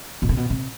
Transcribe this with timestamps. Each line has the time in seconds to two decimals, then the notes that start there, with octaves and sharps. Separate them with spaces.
0.22 B2
0.29 C3
0.37 B2
0.50 C3